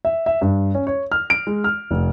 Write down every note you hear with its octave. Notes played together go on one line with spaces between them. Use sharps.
E5
E5
G2
C#4
C#5
F6
D7
G#3
F6
F1